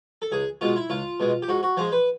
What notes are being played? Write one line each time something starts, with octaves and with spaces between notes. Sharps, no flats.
A4
C#2 G#4
B2 G#3 F4
E4
C#2 F4
B2 G#3
G4
G#2 F#4
F#4
F3 G#3 C5
B4